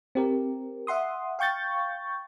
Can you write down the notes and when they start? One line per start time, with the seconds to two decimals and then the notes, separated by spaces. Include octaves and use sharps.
0.15 C4 G4 A#4
0.87 E5 F#5 C6 D#6
1.39 F5 G5 C#6 G6 A6